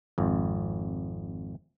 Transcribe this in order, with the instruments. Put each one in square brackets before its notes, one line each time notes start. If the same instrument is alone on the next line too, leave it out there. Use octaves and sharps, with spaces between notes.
[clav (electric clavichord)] G#1 F2